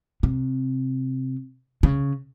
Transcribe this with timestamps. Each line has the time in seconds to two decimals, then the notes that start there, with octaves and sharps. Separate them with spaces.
0.23 C3
1.83 C#3